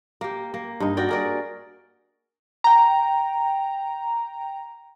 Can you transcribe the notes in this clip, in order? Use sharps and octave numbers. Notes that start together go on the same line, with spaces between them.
A#3 G4
A#3
G2 D#4
F#4 A#4 D5 G5
G#4 A#4 D5
G5 A#5